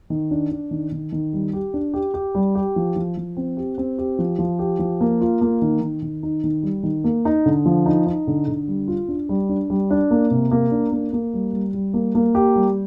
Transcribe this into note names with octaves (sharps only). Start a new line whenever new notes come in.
D#3
D4
D4
D#3
D#3
D#3
G3
G4
D4
G4
G4
G3
G4
F3
F3
F3
C4
G4
C4
G4
F3
F3
G4
F3
A#3
F4
A#3
D#3
D#3
D#3
D#4
D#3
G3
D#3
A#3
D#4
D3
F3
D#4
D#4
D3
D3
G3
F4
D4
G3
D4
G3
D4
A#3
C3
A#3
D4
A#3
A#3
G3
G3
G3
A#3
A#3
G4
G3